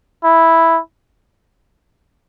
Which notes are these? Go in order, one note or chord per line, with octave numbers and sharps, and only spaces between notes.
E4